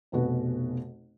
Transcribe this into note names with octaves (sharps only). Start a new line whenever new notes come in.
F1 B1 B2 F#4 B4